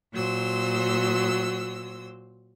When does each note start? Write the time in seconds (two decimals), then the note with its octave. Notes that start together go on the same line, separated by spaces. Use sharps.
0.12 A#2 F#3 C5 E6